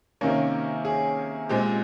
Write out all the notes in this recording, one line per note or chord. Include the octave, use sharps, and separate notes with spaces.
C3 D#3 A#3 C#4 A#4
G#4
A#2 G#3 C4 G4